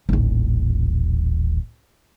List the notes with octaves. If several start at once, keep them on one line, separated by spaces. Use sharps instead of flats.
D#1 A1